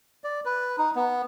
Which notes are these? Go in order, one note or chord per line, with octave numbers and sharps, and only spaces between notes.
D5
B4
D#4
B3